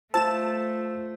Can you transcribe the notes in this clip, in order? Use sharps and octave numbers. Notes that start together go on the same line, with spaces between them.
A3 F4 C5 A5 E6 A6 E7